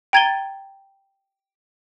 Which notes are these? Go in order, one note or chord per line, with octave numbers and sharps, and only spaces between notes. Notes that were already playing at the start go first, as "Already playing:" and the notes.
G5 A#5 G#6 A6 D#7 G7